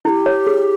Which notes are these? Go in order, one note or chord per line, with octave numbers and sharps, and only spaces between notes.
E4 G4 A4
C#5
G#4